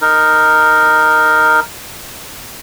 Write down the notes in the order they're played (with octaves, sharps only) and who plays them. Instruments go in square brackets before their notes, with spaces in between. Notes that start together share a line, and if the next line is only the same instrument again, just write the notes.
[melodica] D#4 A#4